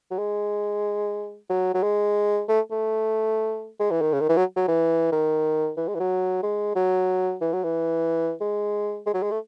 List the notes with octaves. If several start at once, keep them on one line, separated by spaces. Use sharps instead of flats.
F#3
G#3
F#3
F#3
G#3
A3
A3
G#3
E3
D#3
C#3
D#3
E3
F#3
F#3
E3
D#3
E3
G#3
E3
F#3
G#3
F#3
E3
F#3
E3
G#3
G#3
F#3
G#3
A3